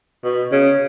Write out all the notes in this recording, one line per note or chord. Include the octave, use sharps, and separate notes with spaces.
B2
C#3